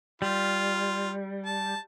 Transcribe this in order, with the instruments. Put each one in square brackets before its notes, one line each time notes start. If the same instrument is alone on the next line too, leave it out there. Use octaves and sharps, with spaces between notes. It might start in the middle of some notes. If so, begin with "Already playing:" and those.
[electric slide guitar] G3 [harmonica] F4
[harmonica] A5